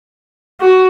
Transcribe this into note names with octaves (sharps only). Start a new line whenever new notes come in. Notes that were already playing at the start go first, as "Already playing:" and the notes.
F#4